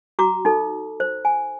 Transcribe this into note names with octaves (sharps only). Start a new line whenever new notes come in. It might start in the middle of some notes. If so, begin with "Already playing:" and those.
F#4 A#5 D6
D#4 A4
C5
G#5